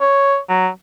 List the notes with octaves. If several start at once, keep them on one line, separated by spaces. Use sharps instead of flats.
C#5
F#3